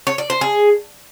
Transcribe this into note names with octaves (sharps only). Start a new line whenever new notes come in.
C#5
D5
C5
G#4